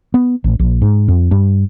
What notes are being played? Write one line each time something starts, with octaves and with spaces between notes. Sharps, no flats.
B3
A1
A#1
G#2
F2
G2